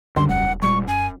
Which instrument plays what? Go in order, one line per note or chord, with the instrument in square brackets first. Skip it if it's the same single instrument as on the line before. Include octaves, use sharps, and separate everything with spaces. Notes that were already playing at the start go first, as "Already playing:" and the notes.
[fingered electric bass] C#2 F#2 G3 [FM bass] D3 [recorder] C6
[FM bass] E1 [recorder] F#5
[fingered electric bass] A#2 G3 G#3 [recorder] C#6
[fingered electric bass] F#2 [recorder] G#5